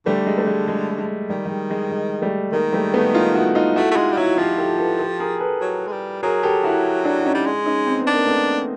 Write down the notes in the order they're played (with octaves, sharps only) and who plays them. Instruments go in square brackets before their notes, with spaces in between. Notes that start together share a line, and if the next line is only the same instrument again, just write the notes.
[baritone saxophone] D3 [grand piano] G3 A3
[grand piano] G#3
A3
G#3
G#3
G#3
[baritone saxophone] D#3 [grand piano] G3
[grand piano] G3
G#3
G#3
G#3
G3 A3
[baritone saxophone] D#3 [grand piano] G#3 A#3
[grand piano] G3 A3
A3 B3
D#4 F4
E4 F#4
D#4 F4
[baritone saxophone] A3 [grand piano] E4 F#4
[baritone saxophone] A3
[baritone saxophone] G#3 [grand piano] D#4 F4
[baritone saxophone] G3
[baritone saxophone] F#3 [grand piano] E4 F#4
[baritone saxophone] F3 [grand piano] F4 G4
[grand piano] G4 A4
A4 B4
G4 A4
G#4 A#4
A4 B4
[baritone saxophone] F#3
G#3
G3
[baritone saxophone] F#3 [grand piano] G#4 A#4
[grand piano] G4 A4
E4 F#4
D4 E4
C#4 D#4
[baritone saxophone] G3
G#3
[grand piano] C#4 D#4
C4
B3
[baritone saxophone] D4
[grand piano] A#3
A3 B3